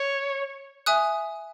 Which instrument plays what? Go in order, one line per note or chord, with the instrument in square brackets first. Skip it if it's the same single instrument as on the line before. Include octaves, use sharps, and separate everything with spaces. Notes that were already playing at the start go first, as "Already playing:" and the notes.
Already playing: [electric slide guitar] C#5
[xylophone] E5 G#5 D#6 F#6